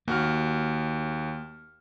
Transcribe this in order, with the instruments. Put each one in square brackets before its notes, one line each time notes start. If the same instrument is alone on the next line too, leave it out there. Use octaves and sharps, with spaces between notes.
[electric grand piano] D#2 F#4 F6 [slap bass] A#3